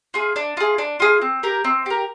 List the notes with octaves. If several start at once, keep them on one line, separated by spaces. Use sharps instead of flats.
F4 G#4
D4
F4 G#4
D4
F4 G#4
C4
G4 A#4
C4
G4 A#4